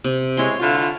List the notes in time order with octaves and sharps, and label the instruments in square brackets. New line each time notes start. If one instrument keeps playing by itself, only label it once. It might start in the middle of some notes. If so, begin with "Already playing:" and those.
[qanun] C3
[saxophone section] G#3 E4 [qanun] C#5 C6
[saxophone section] D3 E4 F4